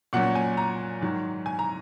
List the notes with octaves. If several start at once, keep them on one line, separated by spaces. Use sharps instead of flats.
A#2 F#3 C#4 F#5
G#5
A#5
G#2 D#3 F#3
G#5
A#5